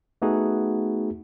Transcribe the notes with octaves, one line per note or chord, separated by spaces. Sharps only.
A3 B3 D#4 F#4 G#4